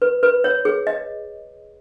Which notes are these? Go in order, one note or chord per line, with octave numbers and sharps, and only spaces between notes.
B4
B4
C#5
G#4
D#5